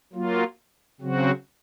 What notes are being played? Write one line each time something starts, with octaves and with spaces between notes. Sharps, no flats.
F#3 A#3 F4
C#3 F#3 C4 F#4